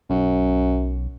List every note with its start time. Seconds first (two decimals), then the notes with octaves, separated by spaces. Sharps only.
0.10 B1 F#2